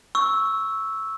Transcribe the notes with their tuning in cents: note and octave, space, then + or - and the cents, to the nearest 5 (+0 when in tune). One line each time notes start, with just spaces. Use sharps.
C#6 +0 E6 -5